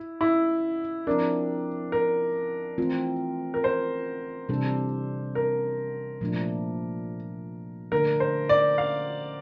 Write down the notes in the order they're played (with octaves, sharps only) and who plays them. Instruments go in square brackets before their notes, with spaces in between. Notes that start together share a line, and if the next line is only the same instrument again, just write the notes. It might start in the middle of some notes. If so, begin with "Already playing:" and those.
Already playing: [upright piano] E4
E4
[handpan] F3 C4 E4 A#4 [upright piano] D4
[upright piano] A#4
[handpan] E3 A3 C4 F4
[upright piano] A#4
C5
[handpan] C3 E3 G3 D4 A4
[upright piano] A#4
[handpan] A#2 F3 A3 D4
[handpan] D3 A3 D4 [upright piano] A#4
[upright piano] C5
D5
F5